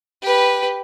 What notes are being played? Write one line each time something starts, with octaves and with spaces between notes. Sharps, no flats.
G4 B4